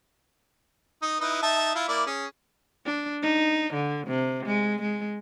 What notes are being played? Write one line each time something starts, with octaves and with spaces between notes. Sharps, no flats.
D#4
D#4 E4 B4
D#4 E5 A5
E4 F4
A#3 E4 D5
C#4 G#4
D4
D#4
D3
C3
G#3
G#3